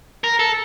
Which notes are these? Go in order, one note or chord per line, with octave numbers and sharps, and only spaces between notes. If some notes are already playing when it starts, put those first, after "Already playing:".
A#4
A4